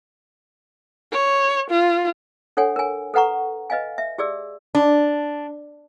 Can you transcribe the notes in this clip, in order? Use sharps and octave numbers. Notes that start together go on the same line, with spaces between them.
C#5
F4
D4 A4 C#5 F#5 G#5
A#4 G#5
A4 B4 F#5 A#5 C#6
B4 D#5 F5 G#5
E5
G4 G#4 D5 E6
D4